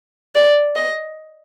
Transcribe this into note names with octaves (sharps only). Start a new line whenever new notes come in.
D5
D#5